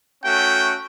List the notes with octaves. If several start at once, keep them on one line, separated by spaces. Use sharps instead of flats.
A3 C#4 F#4 G5